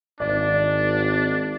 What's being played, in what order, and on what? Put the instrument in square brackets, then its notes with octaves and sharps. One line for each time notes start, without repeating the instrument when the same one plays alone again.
[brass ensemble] G#1 [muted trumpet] D4 [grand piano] D5